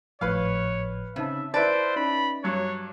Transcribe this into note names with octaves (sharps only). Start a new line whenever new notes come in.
G#1 A2 F3 B4 C#5 F5
C#3 C4 D#4 E5 A5
E4 B4 C5 D5 A5 B6
C#4 D#4 B5
G2 F#3 C#5